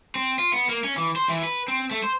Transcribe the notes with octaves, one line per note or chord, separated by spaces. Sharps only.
C4
F4
B3
A#3
C#4
E3
C5
E3
B4
C4
A3
C5